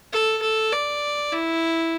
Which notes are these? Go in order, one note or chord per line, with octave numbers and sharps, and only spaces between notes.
A4
A4
D5
E4